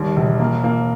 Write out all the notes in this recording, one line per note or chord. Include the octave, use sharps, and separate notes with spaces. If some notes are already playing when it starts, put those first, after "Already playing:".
Already playing: D#2 G3
E1
A#3
A#3